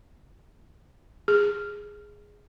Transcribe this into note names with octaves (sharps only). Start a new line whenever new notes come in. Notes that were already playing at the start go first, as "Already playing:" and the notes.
G#4